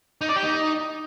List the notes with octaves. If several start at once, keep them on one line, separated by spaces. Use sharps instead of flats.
D#4
D5
G4
D#4